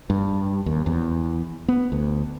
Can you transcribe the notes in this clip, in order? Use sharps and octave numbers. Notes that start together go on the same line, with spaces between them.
G2
D#2
E2
B3
D2